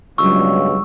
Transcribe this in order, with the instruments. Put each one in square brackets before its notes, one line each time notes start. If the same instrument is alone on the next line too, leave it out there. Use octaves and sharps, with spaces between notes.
[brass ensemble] C#2 G2 B2 [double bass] F#3 G3 [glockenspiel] C#6 E6